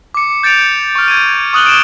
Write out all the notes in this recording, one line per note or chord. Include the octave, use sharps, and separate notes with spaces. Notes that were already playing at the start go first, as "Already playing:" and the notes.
D6 C#7
G6 A6 C#7 D7 F7
C#6 F6
G#6 D#7
C#6 D#6 F#6 F#7 G7
D7 E7 G7